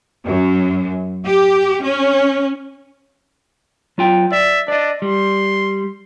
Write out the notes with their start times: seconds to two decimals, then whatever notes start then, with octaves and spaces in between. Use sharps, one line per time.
0.25 F#2
1.27 G4
1.84 C#4
3.98 F#3 F4 G5
4.32 D5 E5
4.68 D4 D5 D#5
5.02 G3 C6